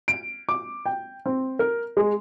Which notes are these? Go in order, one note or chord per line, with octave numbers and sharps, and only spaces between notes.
D7
D6
G5
C4
A#4
G#3